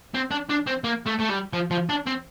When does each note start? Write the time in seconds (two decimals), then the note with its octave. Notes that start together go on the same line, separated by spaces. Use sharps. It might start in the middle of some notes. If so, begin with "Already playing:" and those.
0.14 C4
0.31 D4
0.49 D4
0.67 C4
0.84 A#3
1.07 A3
1.20 A3
1.30 G3
1.53 F3
1.71 F3
1.89 D4
2.07 C4